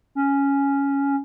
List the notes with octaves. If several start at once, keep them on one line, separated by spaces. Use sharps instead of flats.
C#4